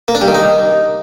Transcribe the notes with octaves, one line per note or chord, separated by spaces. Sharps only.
A#3
D4
G3
D#3
D#4